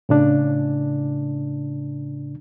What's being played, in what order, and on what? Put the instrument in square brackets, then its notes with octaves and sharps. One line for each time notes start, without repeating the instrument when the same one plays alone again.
[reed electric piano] A2 C#3 D4